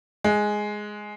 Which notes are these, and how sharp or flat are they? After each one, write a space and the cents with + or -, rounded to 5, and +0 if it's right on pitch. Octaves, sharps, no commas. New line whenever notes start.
G#3 +5